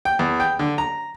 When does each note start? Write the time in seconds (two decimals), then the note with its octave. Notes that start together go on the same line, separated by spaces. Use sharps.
0.05 G5
0.19 E2
0.40 G5
0.59 D3
0.78 A#5